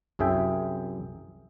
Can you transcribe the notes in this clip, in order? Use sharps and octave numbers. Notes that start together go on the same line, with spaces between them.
C2 F#2 G#4 E5 G5